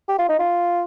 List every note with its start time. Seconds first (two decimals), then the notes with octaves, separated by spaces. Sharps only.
0.09 G4
0.19 F4
0.29 D#4
0.39 F4